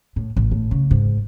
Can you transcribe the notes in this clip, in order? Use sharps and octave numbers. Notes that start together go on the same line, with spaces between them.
A2
A1
A2
C#3
G#2